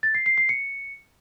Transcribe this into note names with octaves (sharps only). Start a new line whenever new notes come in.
A6
C7
C7
C7
C#7